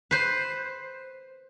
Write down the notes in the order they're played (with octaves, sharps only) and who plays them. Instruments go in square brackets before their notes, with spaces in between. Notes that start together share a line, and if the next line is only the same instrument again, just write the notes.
[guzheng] B4 C5